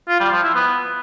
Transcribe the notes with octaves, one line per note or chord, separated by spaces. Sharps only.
F4
G3
F3
E4
B3